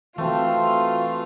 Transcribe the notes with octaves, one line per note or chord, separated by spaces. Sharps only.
E3 A3 C4 F4 F#4 A5 C6